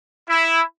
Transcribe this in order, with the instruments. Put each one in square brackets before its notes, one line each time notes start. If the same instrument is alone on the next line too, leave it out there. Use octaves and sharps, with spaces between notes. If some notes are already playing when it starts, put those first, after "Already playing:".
[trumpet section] E4